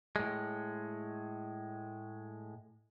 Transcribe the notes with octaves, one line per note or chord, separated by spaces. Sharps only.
A2 G#3